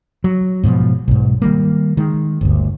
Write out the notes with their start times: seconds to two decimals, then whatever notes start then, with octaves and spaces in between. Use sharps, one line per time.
0.24 F#3
0.63 G#2 B2 D3 F3
1.08 B1 G#2
1.42 D#3 G3 A#3
1.97 D#3 G#3
2.41 G1 D2